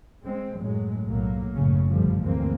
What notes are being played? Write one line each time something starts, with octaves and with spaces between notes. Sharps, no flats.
G#3 C4
F#2 A2 F#3 G#3
B1 A2 F#3 A#3
F#1 A2 C#3 C#4
A#1 G2 D3 F3 G3 A3
D2 E3 G#3 A#3 C4